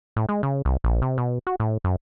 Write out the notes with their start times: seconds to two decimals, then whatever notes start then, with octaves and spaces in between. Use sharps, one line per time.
0.16 A2
0.29 G#3
0.43 C#3
0.65 C2
0.84 A#1
1.02 C3
1.18 B2
1.47 F#4
1.60 A2
1.84 F#2